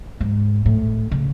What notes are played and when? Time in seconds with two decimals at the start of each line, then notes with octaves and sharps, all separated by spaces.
0.20 G#2
0.66 A2
1.11 C#3